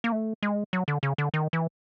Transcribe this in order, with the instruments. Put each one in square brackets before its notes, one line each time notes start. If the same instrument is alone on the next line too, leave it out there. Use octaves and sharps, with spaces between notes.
[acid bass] A#3
A3
G#3
F#3
D3
C#3
D3
D#3
E3